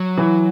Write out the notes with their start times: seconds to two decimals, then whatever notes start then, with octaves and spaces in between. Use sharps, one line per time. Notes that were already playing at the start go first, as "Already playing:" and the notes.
Already playing: F#3
0.18 E3